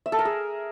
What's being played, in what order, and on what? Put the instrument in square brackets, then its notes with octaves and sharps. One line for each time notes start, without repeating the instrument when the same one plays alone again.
[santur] E5
A4
A#4
G#4